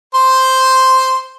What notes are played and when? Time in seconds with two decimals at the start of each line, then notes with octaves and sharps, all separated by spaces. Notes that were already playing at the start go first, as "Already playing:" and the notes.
0.15 C5 C6